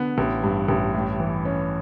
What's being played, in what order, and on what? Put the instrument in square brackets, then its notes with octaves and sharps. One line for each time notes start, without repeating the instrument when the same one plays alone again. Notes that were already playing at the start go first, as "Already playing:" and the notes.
Already playing: [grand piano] D3 B3
A1
G2
A1
A2
E3
C#4